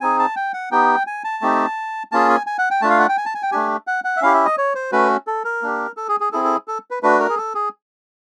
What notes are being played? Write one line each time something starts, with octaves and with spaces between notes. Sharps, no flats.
C4 D#4 G#4 G#5
A5
G5
F#5
B3 D#4 G4 G5
G#5
A5
A3 C4 D#4 G4
A#3 C#4 F4 G#4 A5
G#5
G#5
F#5
G5
A3 D4 F4 A5
F5
F#5
G5
G#5
A5
G#5
G5
A3 D4 G4 G#5
F#5
F#5
E5
C#4 E4 G4 F5
E5
D#5
C#5
C5
A3 C#4 F#4 B4
A4
A#4
A#3 D4 G4
A4
G#4
G#4
C4 E4 G#4 A4
A4
A4
B4
A3 D4 F#4 B4
A#4
G#4
A4
G#4